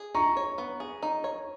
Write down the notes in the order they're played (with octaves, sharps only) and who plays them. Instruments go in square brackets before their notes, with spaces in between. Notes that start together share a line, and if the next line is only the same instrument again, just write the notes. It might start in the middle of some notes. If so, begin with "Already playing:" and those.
Already playing: [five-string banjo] G#4
[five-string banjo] D#4 [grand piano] A#5 C#6
[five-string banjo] C#5
B3
G#4
D#4
C#5